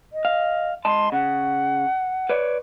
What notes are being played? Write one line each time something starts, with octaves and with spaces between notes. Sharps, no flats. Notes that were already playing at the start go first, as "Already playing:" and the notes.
D#5
F5
G#2 D#5 A5 C6
C#3 F#5
B4 C#5 D5